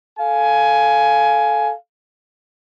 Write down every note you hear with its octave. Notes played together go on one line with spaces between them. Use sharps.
A4 F5 G#5